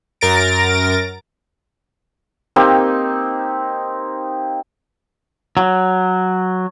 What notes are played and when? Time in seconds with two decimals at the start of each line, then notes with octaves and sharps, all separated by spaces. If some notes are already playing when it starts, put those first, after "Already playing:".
0.21 F#2 A#4 A6 A#6 D7
2.56 A#3 C4 D#4 G4
5.57 F#3